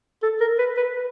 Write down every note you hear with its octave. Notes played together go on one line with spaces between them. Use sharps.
A4
A#4
B4
B4
B4